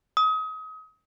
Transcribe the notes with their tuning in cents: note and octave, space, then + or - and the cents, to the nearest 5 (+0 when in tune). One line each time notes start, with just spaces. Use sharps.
D#6 +30